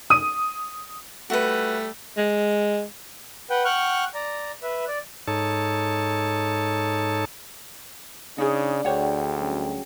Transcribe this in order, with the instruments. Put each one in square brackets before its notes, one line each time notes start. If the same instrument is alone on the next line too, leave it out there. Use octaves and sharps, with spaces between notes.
[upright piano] D#6 D#7
[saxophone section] G3 A3 [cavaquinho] F#4 B4
[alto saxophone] G#3
[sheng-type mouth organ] B4 F#5 G5
F#5 G5 C#6 F6 F#6
D5 A#5
B4 E5
D5
[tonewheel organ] G#2 D#4 A4 C#5 A5
[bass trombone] C#3 [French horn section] D4 D5 [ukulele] D#4 G#4
[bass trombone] D2 [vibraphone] G#4 G5 [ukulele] C5 C#5 F#5
[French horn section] F#3 G3 C#4